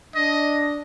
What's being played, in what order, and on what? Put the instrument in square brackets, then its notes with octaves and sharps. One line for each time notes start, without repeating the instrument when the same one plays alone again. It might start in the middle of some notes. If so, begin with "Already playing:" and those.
[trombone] D4 [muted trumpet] D#5